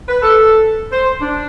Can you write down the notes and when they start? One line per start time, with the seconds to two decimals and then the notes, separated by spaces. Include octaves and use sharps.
0.08 B4
0.23 A4
0.92 C5
1.21 D4